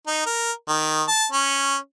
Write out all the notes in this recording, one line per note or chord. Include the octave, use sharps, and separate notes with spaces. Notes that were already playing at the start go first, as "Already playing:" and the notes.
D#4
A#4
D#3
A5
C#4